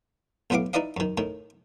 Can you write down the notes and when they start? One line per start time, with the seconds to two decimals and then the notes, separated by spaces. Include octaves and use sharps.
0.50 B1 A2 B3 E4 F5 D6
0.73 D#4 E4 B4 D5 D#5 F5
0.97 F#2 D#3
1.18 A2 D#3